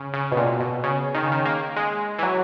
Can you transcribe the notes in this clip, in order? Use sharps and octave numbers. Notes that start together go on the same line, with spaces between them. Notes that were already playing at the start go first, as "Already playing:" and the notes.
Already playing: C#3
C#3
B2
A#2
B2
C#3
D#3
C#3
D#3
A#3
G#3
E3
F#3